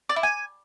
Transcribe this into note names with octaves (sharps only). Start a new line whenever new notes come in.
D5
E4
G#5